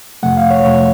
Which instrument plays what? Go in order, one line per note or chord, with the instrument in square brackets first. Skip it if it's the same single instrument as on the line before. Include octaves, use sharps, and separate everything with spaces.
[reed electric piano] F2 C3 F3 A3 F#5
F5
C#5
F2 C3 F3 A3 C#5